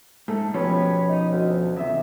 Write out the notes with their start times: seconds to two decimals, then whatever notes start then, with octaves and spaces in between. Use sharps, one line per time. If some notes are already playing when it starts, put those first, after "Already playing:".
0.28 G#2 A3 A4
0.54 B2 F3 C#4 G4 B4 C#5
1.09 D#4
1.31 D2
1.76 E2 C3 E5